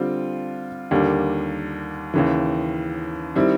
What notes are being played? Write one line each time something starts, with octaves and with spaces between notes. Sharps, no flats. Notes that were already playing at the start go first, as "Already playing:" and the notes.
Already playing: D3 G3 C4 F4
D#2 D3 G3 A#3
D#2 C#3 E3
D#3 G3 C4 E4